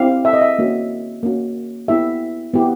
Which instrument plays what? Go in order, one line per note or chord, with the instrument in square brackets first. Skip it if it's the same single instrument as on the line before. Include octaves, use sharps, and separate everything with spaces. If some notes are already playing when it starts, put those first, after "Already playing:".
Already playing: [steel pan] C4 E4 G4 F5
E5
D#5
E5
A#3 C#4 F#4
A#3 C#4 F#4
B3 E4 G4 E5
B3 E4 G4